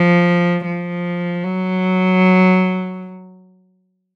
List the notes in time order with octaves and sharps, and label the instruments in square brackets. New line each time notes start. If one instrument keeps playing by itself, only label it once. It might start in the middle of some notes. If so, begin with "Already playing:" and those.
Already playing: [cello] F3
F3
F#3